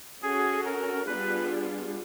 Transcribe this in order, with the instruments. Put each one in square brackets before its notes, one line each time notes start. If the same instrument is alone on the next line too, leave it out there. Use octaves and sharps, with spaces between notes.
[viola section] C#4 F#4 A4 [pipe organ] G#4
[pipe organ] A#4
[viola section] G3 B3 D4 F4 G#4 [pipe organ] B4